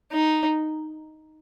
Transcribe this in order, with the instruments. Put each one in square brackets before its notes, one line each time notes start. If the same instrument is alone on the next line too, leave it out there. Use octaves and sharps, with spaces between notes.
[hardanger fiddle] D#4